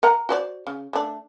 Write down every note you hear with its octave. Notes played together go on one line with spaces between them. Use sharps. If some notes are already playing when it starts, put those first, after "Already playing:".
A#4 F#5 A#5
F#4 C5 D5
C#3
A3 D4